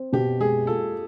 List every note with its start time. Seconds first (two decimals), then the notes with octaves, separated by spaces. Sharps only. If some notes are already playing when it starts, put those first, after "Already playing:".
Already playing: C4
0.13 B2 G4
0.40 G#3 G#4
0.67 F4 A4